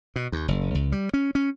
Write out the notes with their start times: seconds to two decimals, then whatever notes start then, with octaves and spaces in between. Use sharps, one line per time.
0.16 B2
0.32 D#2
0.48 F#1
0.75 C#2
0.92 G3
1.14 C#4
1.35 C#4